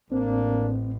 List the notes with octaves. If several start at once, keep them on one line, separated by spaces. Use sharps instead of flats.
A1 A#3 C4 D4